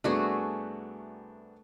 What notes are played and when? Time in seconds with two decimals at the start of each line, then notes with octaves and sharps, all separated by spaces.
0.04 C2 A3 B3 D4 F#4 G#4